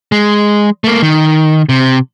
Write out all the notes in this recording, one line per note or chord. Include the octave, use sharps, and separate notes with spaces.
G#3
A3 A#3
D#3
C3